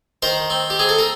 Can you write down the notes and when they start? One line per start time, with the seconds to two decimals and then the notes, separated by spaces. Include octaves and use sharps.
0.22 D#3 A#4 C5
0.50 C4
0.70 G4
0.79 C4 G#4
0.89 A4
0.99 A#4